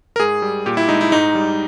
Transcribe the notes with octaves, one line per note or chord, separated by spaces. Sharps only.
A#4
G#2 G#4
G3
A#2 G4
E4
G#3 D#4
E4
G#2 D#4
G3